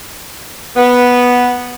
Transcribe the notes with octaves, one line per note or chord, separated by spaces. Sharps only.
B3